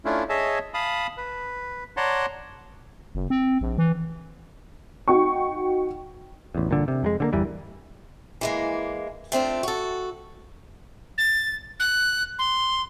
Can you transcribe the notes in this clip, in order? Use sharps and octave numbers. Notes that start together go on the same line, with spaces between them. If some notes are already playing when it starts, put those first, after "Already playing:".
A3 C#4 D4 E4 F4
G#4 C#5 D#5 E5 A5
F5 A5 B5 D#6
B4
C#5 D5 F#5 A5 A#5 C6
F#1
C4
A#1
E3
D#4 F#4 G5 C#6
A1 E2
G1 A#2 D3
C3
F2 F#3 G#3
D3 G#3 A#3
G1 E2 E3 G3
E3 G#3 A#3
A3 C4 D4 F4
F#4 A4
A6
F#6
C6